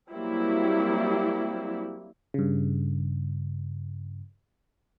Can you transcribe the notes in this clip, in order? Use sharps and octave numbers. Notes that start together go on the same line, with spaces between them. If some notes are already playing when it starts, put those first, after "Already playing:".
F#3 G3 A#3 C4 E4
G2 C#3